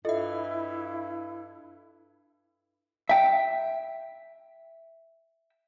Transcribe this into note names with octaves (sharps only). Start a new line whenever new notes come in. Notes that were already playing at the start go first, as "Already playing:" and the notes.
G2 E4 F4 A4 D#5 E5
E5 G5